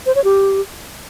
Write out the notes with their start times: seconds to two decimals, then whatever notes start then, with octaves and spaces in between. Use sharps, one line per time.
0.06 C5
0.15 C#5
0.24 G4